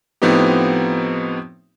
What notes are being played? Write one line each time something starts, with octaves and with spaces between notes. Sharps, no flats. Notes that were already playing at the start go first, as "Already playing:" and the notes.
A2 F3 B3 C4 D#4 G4